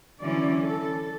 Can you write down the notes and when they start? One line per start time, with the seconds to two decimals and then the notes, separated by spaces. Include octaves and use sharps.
0.22 D3 E3 F#3 C#4 D5
0.60 A4